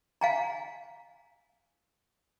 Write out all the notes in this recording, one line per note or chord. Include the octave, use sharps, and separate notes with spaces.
F5 G#5 A#5